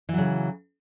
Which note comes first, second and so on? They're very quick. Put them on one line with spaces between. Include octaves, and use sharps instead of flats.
E3 F#3 C#3